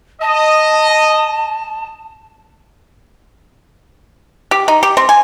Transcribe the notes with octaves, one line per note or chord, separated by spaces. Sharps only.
D#5 A5
G4
D#4
G4
C4
G#5